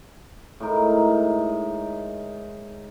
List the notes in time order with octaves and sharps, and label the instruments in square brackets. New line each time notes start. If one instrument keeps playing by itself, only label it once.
[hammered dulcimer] A2 G#3 D#4 A#4